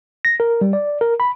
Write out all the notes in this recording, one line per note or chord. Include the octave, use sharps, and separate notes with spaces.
A#6
A#4
G3
D5
A#4
B5